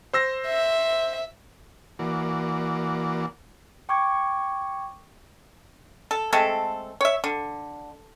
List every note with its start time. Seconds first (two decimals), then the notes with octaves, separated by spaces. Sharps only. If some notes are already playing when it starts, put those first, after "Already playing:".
0.13 C5 E6 A#6
0.46 E5
1.99 E3 A#3 F#4 D5
3.89 G5 C#6 D6 G#6
6.11 A4
6.33 G#3 A3 C4 A4
7.01 C#5 E5
7.24 D3